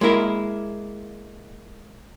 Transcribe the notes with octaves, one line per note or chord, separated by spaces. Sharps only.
G#3 A#3 E4 A#4